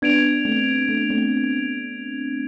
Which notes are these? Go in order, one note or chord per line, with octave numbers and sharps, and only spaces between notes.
B3 D4 G#6 D7 F7
A3 C4
A3
A3 C4